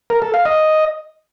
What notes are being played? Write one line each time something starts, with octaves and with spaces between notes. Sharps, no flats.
A#4
A4
F5
D#5